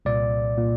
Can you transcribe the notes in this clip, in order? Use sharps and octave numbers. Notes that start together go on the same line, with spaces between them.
C2 A#2 D5
A#2